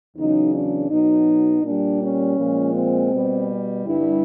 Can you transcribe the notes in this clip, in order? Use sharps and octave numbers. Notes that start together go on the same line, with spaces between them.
E2 C#3 F#3 D#4
D4
B2 F#3 D#4
A#2 G3 D4
C#4
A#2 F3 G#3
C4
B2 G3
G2 D3 G3 E4